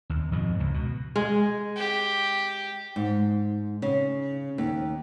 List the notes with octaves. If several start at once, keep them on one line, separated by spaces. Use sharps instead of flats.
D#2
F2 G#2 B2
C#2
B2
G#3
G4
G#2
C#3
D#2